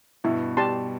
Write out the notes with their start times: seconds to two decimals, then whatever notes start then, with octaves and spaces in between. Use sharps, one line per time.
0.24 G2 B2 E4
0.57 G2 G4 D5 A5 C6